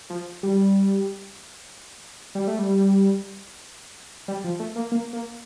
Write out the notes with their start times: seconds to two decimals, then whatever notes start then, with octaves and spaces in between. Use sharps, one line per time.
0.10 F3
0.43 G3
2.35 G3
2.47 A3
2.59 G3
4.28 G3
4.44 F3
4.60 A3
4.76 A#3
4.92 A#3
5.13 A#3